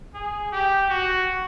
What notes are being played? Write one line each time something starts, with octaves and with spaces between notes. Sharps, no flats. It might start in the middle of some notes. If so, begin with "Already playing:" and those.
G#4
G4
F#4